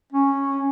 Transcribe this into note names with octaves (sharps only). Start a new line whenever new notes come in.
C#4